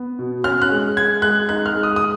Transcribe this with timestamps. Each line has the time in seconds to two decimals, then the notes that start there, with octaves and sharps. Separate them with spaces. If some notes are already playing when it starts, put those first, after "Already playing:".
Already playing: B3
0.19 B2
0.44 C#4 F6
0.62 F#6
0.70 G#3
0.97 G#3 G#6
1.22 G#3 F#6
1.49 D#4 F#6
1.66 F6
1.75 G#3
1.83 D#6
1.96 D#6